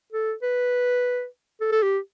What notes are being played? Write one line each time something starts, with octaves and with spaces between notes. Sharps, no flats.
A4
B4
A4
A4
G4